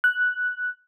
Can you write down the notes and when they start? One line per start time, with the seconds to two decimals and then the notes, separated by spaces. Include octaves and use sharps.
0.04 F#6